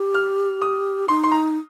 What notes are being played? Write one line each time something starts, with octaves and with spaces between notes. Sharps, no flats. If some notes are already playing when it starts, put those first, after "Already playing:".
Already playing: G4
F6
D#6
D#4 C6
C6
A#5